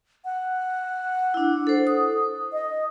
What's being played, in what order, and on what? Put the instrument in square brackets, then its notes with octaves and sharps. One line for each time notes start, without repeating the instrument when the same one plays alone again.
[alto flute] F#5
[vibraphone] D4 E4
A4 C5
D#6
[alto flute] D#5